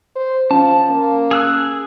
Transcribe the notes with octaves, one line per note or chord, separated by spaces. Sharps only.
C5
F3 C#4 A5
A#3
G#4 E6 F#6